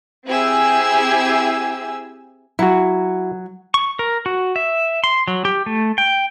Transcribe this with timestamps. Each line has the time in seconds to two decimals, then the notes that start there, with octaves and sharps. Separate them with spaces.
0.26 C4 E4 G4 G#4 G#5 E6
2.59 F#3 E4 F#4
3.74 C#6
3.99 A#4
4.26 F#4
4.56 E5
5.04 C6
5.28 F#3
5.45 G4
5.66 A3
5.98 G5